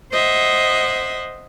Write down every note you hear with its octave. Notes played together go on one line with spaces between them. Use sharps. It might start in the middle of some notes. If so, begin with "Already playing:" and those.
C5 D#5 E5 F#5